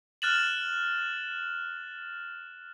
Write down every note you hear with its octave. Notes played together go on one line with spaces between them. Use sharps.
F6 F#6 A6 E7 F#7